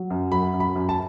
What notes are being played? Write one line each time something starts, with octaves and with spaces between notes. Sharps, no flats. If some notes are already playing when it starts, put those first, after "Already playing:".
Already playing: F#3
F#2
F#3 B5
F#2
B5
F#2
A5